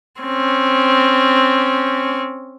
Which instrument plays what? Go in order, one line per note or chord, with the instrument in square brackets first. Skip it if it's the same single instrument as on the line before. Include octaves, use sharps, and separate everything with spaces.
[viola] C4 C#4